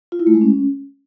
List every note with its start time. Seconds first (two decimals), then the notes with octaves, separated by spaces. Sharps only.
0.12 F4
0.19 E4
0.27 A3
0.34 G#3
0.41 C#4